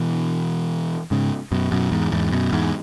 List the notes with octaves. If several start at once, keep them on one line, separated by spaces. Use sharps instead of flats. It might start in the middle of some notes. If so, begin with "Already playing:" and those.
Already playing: B2 E3
G#2 C#3
F#2 B2
F#2 B2
E2 G#2
E2 G#2
F#2 B2
E2 G#2